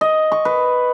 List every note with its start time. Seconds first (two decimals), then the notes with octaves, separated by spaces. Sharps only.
0.01 D#5
0.32 C#6
0.45 B4